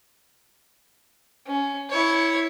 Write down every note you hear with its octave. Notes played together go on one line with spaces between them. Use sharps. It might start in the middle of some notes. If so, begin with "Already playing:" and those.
C#4
E4 C#5